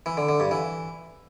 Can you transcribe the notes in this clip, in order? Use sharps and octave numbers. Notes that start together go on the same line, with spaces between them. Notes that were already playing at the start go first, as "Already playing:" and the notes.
E3
D3
D3
G2
E3